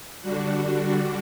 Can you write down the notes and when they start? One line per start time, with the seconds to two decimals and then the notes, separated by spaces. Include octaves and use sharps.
0.22 D3 G3 D4 F#4